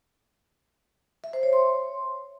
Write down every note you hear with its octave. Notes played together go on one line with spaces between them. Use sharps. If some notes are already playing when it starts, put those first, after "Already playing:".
E5
C5
C#5
C6